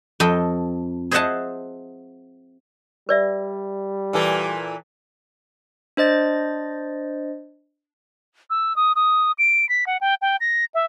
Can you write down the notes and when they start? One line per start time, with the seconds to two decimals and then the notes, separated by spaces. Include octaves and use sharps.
0.20 F2 A4 D#5 G5
1.11 G#4 C5 D#5 E5 F#5 A5
3.09 G3 B4 D5 E5
4.13 A#2 E3 A4
5.97 D4 C5 D#5 A6
8.50 E6
8.76 D#6
8.96 D#6
9.38 D7
9.69 B6
9.86 F#5
10.01 G5
10.22 G5
10.40 A#6
10.74 E5